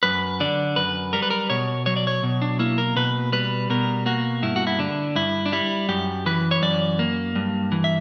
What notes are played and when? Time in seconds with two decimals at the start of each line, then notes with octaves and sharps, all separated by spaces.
0.03 F#2 B4
0.40 D3 D5
0.76 F#2 B4
1.13 G3 A#4
1.22 B4
1.30 A#4
1.50 B2 C#5
1.86 F#3 C#5
1.96 D5
2.07 C#5
2.23 B2
2.42 D4
2.59 A#3 E4
2.78 A#4
2.96 B2 B4
3.32 G3 B4
3.70 B2 A#4
4.06 A#3 F#4
4.42 G2 E4
4.56 F#4
4.67 E4
4.79 D3 D4
5.15 G2 E4
5.46 D4
5.52 G3 E4
5.89 F#2 G4
6.26 E3 B4
6.51 C#5
6.62 F#2 D5
6.99 A#3
7.35 G2
7.72 E3
7.84 E5